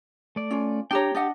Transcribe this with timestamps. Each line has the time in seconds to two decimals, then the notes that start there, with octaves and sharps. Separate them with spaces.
0.36 A3 D5
0.51 C#4 F4
0.91 D4 G4 C#5 G5 A#5
1.15 D4 G4 D#5 F#5